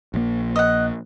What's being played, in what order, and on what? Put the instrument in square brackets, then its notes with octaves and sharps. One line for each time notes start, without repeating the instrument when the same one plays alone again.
[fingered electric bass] A#1 A#3
[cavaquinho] D#5 F#5